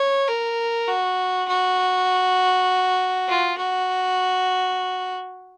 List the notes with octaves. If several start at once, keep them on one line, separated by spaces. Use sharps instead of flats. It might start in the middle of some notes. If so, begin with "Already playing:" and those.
Already playing: C#5
A#4
F#4
F#4
F4
F#4